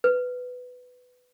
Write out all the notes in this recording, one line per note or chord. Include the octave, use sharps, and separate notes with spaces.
B4